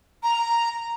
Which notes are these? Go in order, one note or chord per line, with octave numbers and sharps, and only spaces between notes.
A#5